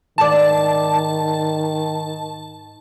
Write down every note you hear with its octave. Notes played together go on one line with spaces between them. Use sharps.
G#2 D#3 D5 A5